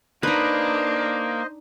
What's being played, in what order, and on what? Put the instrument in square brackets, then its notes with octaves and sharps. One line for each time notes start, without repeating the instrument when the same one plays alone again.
[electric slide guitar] A#3 [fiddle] D4 [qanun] D#4 B4 [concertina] C5 D#5